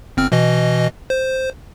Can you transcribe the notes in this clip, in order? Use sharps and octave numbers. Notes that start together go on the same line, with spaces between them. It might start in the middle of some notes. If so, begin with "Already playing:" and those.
G1 C4 F6
B2 E3 D#5
C5